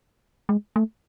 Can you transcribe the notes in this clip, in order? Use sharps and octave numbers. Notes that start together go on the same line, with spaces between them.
G#3
A3